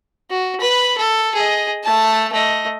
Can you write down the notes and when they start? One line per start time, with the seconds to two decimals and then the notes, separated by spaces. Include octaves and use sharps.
0.30 F#4
0.60 B4 B5
0.97 A4
1.34 G#4 D#5
1.83 A3 A5
2.32 A3 D#5